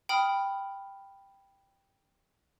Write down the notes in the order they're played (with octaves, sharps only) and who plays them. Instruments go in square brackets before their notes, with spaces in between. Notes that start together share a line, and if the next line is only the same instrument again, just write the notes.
[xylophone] G5 B5 D#6 F6